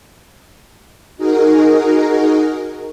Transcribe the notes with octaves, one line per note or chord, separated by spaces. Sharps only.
D#4 F#4 G#4 A#4